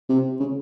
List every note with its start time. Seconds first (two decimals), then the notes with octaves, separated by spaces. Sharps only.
0.09 C3
0.40 C#3